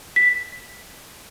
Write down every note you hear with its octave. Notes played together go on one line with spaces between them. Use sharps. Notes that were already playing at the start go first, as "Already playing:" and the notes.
B6